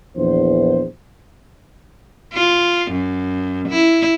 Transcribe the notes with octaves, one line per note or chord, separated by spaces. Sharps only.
A#1 E2 C5
F4
F#2
E4